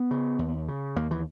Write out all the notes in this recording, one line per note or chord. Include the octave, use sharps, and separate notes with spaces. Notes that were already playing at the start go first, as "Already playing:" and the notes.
Already playing: B3
C#3
D#2
C#3
D#2 A#3
E3